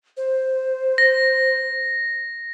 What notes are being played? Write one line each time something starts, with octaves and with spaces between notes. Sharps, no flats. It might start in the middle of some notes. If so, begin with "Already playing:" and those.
C5
A#6